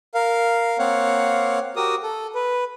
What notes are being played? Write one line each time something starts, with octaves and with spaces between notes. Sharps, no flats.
A#4 F5
A#3 C4 C#5 F5 F#5
F#4 G4 A#4 D#6
A4
B4